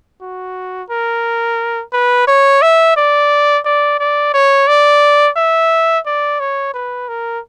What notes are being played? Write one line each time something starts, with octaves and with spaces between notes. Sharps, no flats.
F#4
A#4
B4
C#5
E5
D5
D5
D5
C#5
D5
E5
D5
C#5
B4
A#4